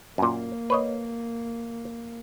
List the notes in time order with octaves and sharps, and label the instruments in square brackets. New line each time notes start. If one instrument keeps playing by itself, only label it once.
[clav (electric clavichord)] F#2 A#2 [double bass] A#3
[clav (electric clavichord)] B4 C#5 D#5